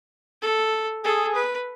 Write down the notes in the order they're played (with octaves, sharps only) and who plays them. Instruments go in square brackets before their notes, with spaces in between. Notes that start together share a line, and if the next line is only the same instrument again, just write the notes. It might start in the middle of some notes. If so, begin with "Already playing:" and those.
[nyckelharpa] A4
[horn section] G#4 [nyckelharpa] A4
[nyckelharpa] B4